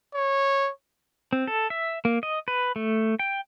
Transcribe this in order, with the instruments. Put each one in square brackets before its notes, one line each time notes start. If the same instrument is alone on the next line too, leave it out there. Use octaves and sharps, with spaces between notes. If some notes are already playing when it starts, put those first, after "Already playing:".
[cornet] C#5
[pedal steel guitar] C4
A4
E5
A#3
D#5
B4
A3
G5